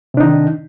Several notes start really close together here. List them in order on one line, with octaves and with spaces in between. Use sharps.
C3 D4 D#4 D#3